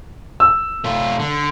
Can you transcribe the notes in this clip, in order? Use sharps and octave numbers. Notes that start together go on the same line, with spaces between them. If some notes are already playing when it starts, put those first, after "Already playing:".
E6
A3 F4
D3